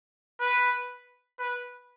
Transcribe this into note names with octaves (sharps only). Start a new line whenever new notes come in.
B4
B4